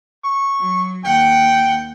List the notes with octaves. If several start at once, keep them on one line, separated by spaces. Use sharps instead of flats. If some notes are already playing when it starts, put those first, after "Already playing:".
C#6
F#3
D#2 F#5 G5